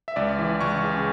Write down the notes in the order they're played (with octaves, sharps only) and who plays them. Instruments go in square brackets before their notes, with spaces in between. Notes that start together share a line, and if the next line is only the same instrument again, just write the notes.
[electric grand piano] E5
C#2 D5
E3
C#2 C#6
C#3